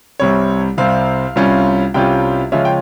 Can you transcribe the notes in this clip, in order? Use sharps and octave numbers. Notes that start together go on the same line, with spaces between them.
C2 C3 G3 C4 C#5
C2 C3 G3 C4 F5
C2 C3 G3 C#4 F4
C2 C3 G3 C#4 F4 G5
C#3 F3 G#3 C#4 F4 E5
G5